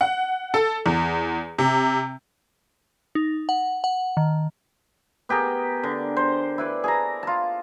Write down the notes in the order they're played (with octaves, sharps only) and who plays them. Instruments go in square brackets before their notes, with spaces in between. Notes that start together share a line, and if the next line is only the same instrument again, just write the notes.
[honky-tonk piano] F#5
A4
E2
C3
[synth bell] D#4
F#5
F#5
D#3
[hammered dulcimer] B3 G4 G#4 A#4
D3
C5
E4 B4 D5
G#4 A5 A#5
F4 A5